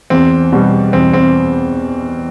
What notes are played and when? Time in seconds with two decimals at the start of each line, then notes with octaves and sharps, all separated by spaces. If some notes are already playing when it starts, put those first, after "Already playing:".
0.10 E2 C4
0.52 B2 G3
0.93 E2 C4
1.13 C4